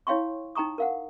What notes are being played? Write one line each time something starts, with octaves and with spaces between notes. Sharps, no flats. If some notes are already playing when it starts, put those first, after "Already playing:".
E4 C#5 F5 G5 C6 C#6
D#4 G5 A#5 C#6 D#6
A#4 F5 F#5